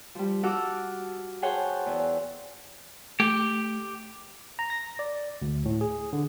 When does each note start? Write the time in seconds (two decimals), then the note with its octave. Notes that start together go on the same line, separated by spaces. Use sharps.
0.15 F3 G3
0.43 F#4 A4 F5 F#5 D6 E6
1.42 G#4 C5 C#5 F#5 G5 A5
1.86 E2
3.20 A3 G4
4.59 A#5
4.70 A#6
4.99 D5
5.42 D2
5.65 A2
5.81 G#4
6.13 D3